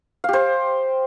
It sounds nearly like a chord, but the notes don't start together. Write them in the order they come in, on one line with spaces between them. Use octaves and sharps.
F5 G4 C5